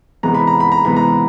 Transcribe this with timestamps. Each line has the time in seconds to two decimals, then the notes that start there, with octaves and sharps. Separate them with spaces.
0.23 C3 E3 G#3 B3 A#5
0.34 B5
0.47 A#5
0.60 B5
0.72 A#5
0.85 C3 E3 G#3 B3 B5
0.96 A#5